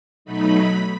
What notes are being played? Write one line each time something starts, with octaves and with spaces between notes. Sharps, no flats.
B2 F#3 A3 D#4 B5